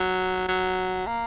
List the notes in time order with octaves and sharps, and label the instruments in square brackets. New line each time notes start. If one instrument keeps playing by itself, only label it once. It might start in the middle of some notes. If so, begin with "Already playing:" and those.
Already playing: [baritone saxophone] F#3
F#3
A#3